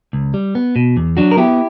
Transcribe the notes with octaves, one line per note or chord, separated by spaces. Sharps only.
C#2
G3
B3
B2
E2
F#3 D4 F#4
A#4
B3 E4 G4